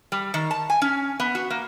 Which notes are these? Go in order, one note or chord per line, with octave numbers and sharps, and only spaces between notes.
G3
D#3
A5
G#5
C#4
B3
F#4
A#3